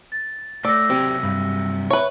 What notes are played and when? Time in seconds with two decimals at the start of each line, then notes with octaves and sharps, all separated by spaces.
0.12 A6
0.65 A2 A3 D5 E6 A#6
0.90 C3 F#3 C4 G4
1.23 G2
1.90 B4 C#5 E5